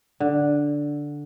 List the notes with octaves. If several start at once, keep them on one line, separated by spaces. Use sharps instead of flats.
D3